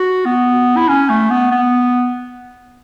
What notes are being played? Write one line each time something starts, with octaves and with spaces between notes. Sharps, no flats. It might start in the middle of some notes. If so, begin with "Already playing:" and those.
Already playing: F#4
B3
E4
C#4
A3
B3
B3